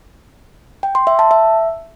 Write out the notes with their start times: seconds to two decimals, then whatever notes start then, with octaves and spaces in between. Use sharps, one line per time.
0.83 G5
0.95 C6
1.07 E5
1.19 A5
1.31 E5